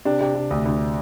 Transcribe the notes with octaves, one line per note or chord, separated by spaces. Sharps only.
C3 D4
C3
C3
D2
D2